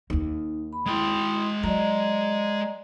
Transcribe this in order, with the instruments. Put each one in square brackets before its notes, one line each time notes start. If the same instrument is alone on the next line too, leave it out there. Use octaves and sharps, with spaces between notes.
[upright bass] D#2 A#3 [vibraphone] D#4
[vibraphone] B5
[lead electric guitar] G#3 G5 [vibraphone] E4 C6 D#6
[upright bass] F#3 [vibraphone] D5 D#5 A#5